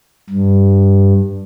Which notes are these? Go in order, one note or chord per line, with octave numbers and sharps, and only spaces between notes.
G2